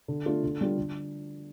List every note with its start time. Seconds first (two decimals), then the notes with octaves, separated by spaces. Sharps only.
0.08 D3
0.26 A3 D4 F4 A4
0.43 D3
0.61 G3 D4 F4
0.77 D3